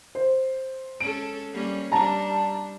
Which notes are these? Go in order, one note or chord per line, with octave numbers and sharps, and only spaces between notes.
C5
G#3 C#4 A4 D7
G3 A#3 C#4
G3 D4 A5 A#5